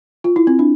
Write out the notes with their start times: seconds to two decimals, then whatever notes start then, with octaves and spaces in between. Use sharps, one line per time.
0.24 F4
0.36 E4
0.47 C4
0.59 D4